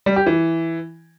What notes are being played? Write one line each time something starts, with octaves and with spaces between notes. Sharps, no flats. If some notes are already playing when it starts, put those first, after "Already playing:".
G3
G4
E3